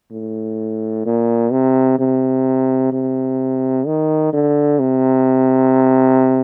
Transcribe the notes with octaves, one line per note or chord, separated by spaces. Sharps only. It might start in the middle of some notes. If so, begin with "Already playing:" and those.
A2
A#2
C3
C3
C3
D#3
D3
C3